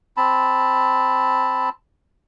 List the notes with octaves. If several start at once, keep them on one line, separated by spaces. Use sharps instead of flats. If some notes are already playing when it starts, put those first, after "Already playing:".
C4 A5 B5